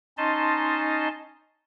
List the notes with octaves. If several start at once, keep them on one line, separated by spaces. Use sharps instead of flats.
C#4 D#4 D#5 A5 C6